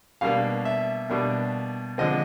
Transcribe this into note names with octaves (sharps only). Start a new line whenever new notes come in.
B2 G3 A#3 D4 F5
E5
B2 G3 A#3 D4
D3 F3 G#3 C4 D#5